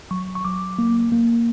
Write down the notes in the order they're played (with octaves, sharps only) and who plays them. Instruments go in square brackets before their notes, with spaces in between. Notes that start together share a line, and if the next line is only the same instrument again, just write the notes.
[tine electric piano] F#3 C#6
C#6
F#3 D6
A#3
A#3